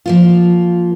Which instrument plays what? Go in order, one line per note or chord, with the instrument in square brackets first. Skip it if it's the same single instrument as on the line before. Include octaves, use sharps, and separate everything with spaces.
[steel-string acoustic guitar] F3 A#3 F4